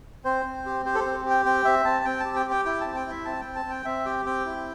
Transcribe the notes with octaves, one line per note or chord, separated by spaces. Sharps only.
C4 C5
C4
G4
G4 C5
A4
C5
C4
G4
G5
C4 G5
C4 E5
C4 A5
C4 G5
G4 A5
G5
G4 G5
E4 G5
C4 A5
G5
E4
E5
C4 A5
C4 G5
A5
C4 G5
C4 E5
G4 G5
C4 G5
E4